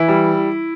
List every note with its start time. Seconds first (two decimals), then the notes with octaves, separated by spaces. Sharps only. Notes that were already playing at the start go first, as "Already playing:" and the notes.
Already playing: E3 E4
0.08 G3